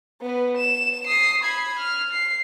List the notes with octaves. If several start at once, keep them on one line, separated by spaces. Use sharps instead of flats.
B3 B4
E7
D#6 C7
B5 G#6
F6
C7